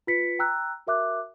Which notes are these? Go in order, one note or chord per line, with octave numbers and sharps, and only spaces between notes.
F4 B4 B6 C#7
G5 A#5 E6 F#6
F#4 A#4 E5 D6 F#6